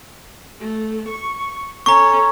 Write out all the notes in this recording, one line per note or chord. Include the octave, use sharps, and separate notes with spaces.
A3
C#6
C#4 A4 A#5 C#6